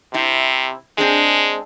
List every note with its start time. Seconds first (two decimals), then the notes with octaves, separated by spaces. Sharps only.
0.14 C3 C4 E4
0.98 G#3 C4 D4 G#4